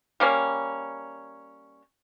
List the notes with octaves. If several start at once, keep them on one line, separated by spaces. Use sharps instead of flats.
G3 A#3 C#4